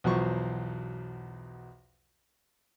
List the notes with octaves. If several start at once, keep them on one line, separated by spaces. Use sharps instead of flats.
B1 E2 F3 F#3 C5 C#6